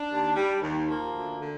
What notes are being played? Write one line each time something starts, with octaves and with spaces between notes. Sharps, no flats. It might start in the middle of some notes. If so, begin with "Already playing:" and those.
Already playing: D4
D#2
G3
D#2
F3 A#3
D2
D3